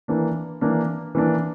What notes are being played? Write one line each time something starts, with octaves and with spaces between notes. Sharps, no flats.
E3 A#3 D4
E3 A#3 D4
E3 A#3 D4